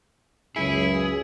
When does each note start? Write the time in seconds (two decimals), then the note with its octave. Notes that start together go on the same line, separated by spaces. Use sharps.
0.56 C#2 F#2 E4 G#4